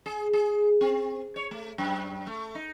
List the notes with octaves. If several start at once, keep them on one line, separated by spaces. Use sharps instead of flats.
G#4
G#4
C4
C#5
A3
F#2
A3
D#4